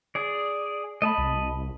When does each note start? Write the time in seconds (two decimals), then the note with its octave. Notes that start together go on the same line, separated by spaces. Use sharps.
0.15 G#4 D5
1.02 A3 D#5 A5 B5
1.18 C2